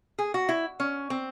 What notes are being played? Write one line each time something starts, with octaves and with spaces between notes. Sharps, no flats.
G#4
F#4
E4
C#4
C4